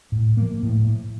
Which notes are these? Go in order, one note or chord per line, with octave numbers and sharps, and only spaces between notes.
A2
F3 A#3
A2